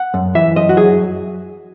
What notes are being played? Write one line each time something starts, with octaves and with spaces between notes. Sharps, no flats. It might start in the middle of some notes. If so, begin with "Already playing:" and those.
Already playing: F#5
F#2
E3 E5
F#2 D#5
F#4
F#3 G#4